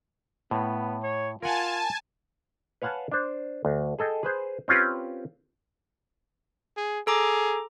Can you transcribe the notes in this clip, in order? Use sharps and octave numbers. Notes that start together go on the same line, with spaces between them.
A2 B3
C#5
F4 A#4 F#5 G#5 A5
B4 C#5 F5 F#5 G#5 A5
D4 C5
D2
G#4 A4 D#5 G5
G#4 B4 C5
C4 C#4 F4 G4 B4
G#4
G#4 A4 A#5 D6